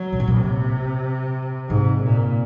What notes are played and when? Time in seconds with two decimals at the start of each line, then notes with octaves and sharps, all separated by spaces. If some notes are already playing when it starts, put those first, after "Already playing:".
Already playing: F#3
0.13 A#2
0.20 G#2
0.28 A#2
0.35 C3
1.69 G#2 C3
2.03 A#2